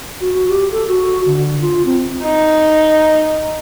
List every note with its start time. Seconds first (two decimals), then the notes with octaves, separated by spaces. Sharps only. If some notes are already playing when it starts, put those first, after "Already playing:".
0.21 F#4
0.34 F#4
0.49 G4
0.71 A4
0.88 F#4
1.26 D3
1.61 F4
1.86 C4
2.23 D#4